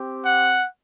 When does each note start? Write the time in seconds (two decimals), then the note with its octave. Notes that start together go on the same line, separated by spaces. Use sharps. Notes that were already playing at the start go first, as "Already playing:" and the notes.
Already playing: C4 G4
0.23 F#5